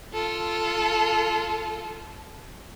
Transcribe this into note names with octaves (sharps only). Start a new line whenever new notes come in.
F4 A4